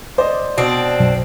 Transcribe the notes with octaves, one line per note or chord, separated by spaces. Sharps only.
C5 D5 D#5
B2 C4 D4
B1 F#2